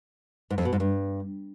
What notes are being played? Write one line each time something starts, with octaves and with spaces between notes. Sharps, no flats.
G#2
F2
B2
G#2
G2